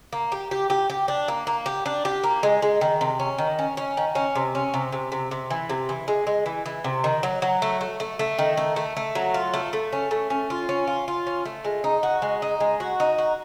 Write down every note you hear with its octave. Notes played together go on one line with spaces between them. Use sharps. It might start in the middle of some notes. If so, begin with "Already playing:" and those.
A#3
G4
G4
G4
G4
D4
A#3
A#3
G4
D4
G4
A#3
G#3
G#3
D#3
C3
C#4
D#3
C#4
C#4
D#3
C#4
C3
C#4
C3
C3
C3
C3
E3
C3
E3
G#3
G#3
E3
E3
C3
D#3
F#3
F#3
A3
A3
A3
A3
D#3
A3
A3
A3
F#3
F4
A3
A3
C#4
A3
C#4
F4
C#4
F4
F4
C#4
A3
G#3
D#4
F#4
G#3
D#4
G#3
F#4
D#4
F#4